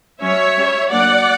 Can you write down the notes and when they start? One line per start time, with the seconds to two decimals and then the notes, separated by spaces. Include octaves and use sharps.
0.21 F#3 C#4 C#5 E5
0.57 G3 C#4
0.91 F#3 A#3 D4 D5 F#5